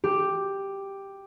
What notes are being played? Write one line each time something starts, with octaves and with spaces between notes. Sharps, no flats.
G4